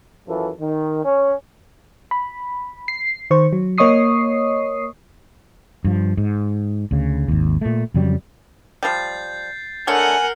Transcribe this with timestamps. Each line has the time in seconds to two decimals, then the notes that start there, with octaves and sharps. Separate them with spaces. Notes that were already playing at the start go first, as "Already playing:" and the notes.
0.28 F#2 E3 F3 A4
0.60 D#3
1.05 C#4
2.11 B5
2.88 C7
3.31 D#3 C5 C#6
3.53 F#3
3.78 A#3 C#5 D#5 C#6 D#6 C7
5.85 G2 F3
6.17 G#2
6.91 D2 C#3
7.28 G#1 D#2
7.61 A#2 A3
7.94 F2 C#3 F#3 G3
8.83 F3 G3 G6 A6 C7
9.87 D3 A3 A#4 C#5 F#5 G#5 F6 C#7